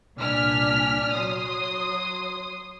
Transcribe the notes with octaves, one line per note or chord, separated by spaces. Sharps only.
C2 A#2 D4 G#5 F6 B6
F#3 C6 D#6